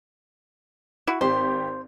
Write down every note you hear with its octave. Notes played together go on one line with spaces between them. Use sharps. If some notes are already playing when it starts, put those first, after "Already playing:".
E4 F#4
G#1 G4 C5